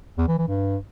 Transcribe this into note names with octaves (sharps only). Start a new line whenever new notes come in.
E2
E3
E3
G2